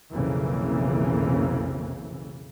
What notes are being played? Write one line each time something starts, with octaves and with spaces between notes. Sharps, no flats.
B1 F2 C#3 E3 A#3